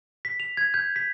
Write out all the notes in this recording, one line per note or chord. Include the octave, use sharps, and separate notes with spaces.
B6
F7
G#6
G6
B6